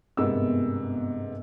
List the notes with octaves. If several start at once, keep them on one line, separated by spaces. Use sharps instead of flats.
G1 G#2 C3 A#3 B3 E6